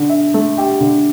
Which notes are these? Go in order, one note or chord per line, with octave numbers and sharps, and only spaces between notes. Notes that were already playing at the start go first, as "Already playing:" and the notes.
Already playing: D3
E5
A3
G4
D3